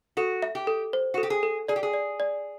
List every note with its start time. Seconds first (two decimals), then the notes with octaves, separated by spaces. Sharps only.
0.17 F#4 A4
0.42 E5
0.55 G4
0.67 A4
0.93 C5
1.14 F#4
1.18 A4
1.23 G4
1.30 G#4
1.43 A4
1.68 G#4 D5
1.76 G4
1.83 G#4
1.93 D5
2.20 D5